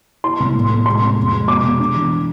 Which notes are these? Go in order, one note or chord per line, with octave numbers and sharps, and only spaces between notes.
E4 C6
C2
A2
A2
G#3 C6
C3
F2
G#3
B2 D6
B2
D4
E3